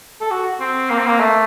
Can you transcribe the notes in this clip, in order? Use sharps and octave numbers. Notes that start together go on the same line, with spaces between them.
A4
F#4
C4
A#3
C4
A#3
A3